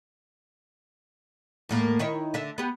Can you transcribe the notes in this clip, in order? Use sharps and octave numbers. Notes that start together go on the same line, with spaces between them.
E2 A2 A#3
D#3 E4 C#5
D3 E5
B3 G4